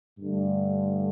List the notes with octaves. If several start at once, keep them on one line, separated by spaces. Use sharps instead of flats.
G2 D3 A3